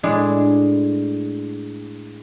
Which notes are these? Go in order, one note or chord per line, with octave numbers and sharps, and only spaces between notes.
A2 G#3 D4